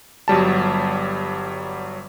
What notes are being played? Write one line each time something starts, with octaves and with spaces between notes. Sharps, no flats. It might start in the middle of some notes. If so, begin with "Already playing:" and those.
G1 F#3 G3 A5